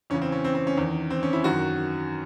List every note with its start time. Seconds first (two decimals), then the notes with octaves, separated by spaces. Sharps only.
0.10 E2 C#3 E3 C#4
0.22 C4
0.32 C#4
0.44 C4
0.55 C4
0.67 C#4
0.77 E2 D#3
1.10 C4
1.23 C#4
1.33 E4
1.44 F#2 D#3 F#4